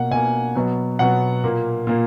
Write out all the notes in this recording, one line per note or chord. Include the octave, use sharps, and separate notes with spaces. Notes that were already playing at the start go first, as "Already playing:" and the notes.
Already playing: B2 A#3 F#5
B2 A#3 G#5
B2 F#3 B3
B2 F#3 B3 F#5
A#2 A#3
A#2 A#3